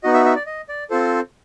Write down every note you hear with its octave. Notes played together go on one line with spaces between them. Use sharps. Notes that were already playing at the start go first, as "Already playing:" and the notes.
B3 D#4 F#4 D#5
E5
E5
D5
D#5
D5
C4 F4 A4 C5